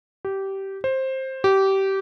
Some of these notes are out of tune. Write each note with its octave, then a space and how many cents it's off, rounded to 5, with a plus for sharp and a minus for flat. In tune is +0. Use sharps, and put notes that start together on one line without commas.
G4 -15
C5 +15
G4 -20